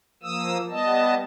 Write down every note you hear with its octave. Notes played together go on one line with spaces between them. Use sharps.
F3 A#3 D#6 E6
G3 B3 D#5 A5